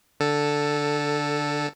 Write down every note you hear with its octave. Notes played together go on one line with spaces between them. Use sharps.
D3 A4